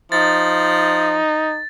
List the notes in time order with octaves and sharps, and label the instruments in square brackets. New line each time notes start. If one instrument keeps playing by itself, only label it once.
[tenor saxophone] F3 [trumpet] D#4 [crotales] A6